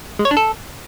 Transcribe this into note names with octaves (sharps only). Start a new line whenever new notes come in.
G#3
C#5
D4
A4